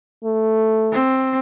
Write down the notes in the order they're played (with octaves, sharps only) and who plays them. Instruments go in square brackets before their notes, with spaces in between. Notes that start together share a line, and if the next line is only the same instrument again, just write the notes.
[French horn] A3
[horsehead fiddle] C4